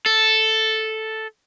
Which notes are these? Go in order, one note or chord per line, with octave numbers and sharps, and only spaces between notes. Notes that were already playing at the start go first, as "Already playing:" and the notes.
A4